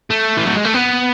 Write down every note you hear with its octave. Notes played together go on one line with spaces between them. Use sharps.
A3
E3
F#3
G#3
A3
B3